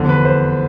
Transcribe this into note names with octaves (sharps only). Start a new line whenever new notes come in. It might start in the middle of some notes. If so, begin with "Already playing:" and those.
Already playing: F1 E2 D3
B4
C5